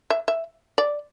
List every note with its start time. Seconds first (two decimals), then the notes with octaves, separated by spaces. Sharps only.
0.10 E5
0.28 E5
0.78 D5